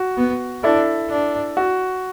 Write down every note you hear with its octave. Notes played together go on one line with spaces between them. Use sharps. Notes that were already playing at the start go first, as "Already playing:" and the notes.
Already playing: F#4
B3
D4 E4 A4
D4
F#4